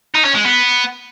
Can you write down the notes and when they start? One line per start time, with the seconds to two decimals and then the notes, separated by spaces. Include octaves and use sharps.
0.15 D#4
0.25 C#4
0.35 G#3
0.45 B3